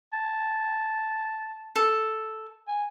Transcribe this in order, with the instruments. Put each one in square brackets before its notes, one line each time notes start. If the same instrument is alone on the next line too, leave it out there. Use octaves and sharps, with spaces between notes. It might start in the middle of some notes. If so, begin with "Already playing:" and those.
[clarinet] A5
[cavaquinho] A4
[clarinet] G#5